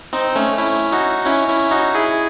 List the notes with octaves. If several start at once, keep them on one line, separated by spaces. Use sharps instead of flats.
C4 D#4
A3 C#4
C#4 E4
D#4 F#4
C#4 E4
C#4 E4
D#4 F#4
E4 G#4